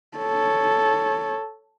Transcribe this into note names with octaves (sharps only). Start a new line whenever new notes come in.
A4 C#5